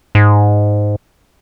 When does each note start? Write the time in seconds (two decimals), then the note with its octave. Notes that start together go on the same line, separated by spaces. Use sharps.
0.15 G#2